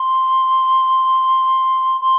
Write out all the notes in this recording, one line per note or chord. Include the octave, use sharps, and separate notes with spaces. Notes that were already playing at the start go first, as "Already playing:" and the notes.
Already playing: C6
C6